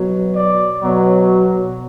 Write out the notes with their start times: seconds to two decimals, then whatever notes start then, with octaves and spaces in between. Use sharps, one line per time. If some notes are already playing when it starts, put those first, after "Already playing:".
Already playing: B2 F#3
0.35 D5
0.81 B2 F#3